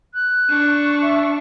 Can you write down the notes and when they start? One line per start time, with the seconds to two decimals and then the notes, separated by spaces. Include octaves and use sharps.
0.14 F#6
0.49 D4 C#6
1.02 E5